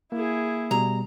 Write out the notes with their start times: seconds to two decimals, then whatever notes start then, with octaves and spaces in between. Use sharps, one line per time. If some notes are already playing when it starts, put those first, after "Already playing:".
0.12 A#3 E4 G#4
0.71 B2 G3 A#5